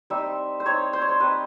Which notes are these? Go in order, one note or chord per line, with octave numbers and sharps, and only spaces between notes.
G3 C4 D#4 E5
C5
G3 C4 D#4 C#5
C5
C#5
C5
G3 C4 D#4 B4